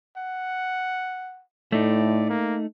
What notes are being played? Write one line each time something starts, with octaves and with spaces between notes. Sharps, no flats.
F#5
A2 A3 D#4 D5
A#3